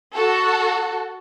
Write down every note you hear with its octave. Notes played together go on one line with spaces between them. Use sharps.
F#4 A4